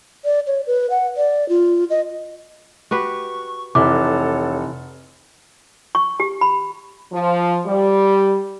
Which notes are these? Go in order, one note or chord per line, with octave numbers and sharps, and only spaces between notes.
D5
C#5
B4
F#5
D5
F4
D#5
F#4 G4 B4 C#6
F1 E3 A4 C#5 F#5 D6
C#6
G4
B5
F3
G3